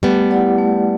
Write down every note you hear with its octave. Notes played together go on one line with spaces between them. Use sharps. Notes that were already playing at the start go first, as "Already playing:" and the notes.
G3 A3 B3
E4 G4 D5 F#5
A3